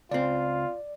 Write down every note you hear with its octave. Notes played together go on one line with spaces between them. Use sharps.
C#2 C4 F4 D5